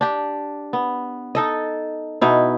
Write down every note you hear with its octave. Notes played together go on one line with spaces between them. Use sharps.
D4 G4
B3
D#4 A4 D#5
B2 D#4 E4